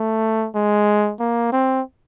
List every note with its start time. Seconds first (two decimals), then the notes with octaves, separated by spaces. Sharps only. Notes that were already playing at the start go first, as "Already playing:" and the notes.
Already playing: A3
0.55 G#3
1.20 A#3
1.52 C4